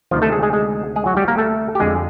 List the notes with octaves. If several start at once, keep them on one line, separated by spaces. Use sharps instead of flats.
D2 C3 D#3 F3 F4
A3 A4
G#3 G#4
G#3 G#4
G#3 G#4
G#3 G#4
F#3 F#4
G3 G4
A#3 A#4
A3 A4
G4
F2 D3 G#3 G#4